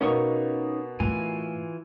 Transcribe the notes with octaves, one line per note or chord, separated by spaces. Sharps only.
B2 A#3 B3 C#4 D#4 C#6
A2 E3 F4 G#5